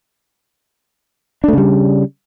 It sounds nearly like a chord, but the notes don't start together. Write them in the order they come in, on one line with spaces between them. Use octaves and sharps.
D4 A3 C#3 G3